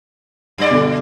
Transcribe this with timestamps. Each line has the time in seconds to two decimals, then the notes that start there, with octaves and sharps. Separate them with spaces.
0.58 F#2 G3 D5
0.71 B2 D3